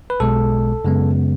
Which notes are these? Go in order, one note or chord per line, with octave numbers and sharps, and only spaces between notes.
B4
B1 B2 G#3 A4
F#2 C#3 G#3 B3